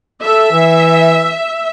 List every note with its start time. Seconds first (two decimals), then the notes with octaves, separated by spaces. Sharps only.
0.22 A4 E5
0.52 E3